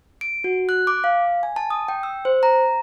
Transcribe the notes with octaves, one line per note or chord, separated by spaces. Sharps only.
D7
F#4
F#6
D6
F5
G#5
A5
D#6
G5
E6
C5
A#5